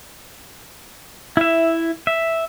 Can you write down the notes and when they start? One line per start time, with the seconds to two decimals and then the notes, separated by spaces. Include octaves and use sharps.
1.37 E4 E5
2.07 E5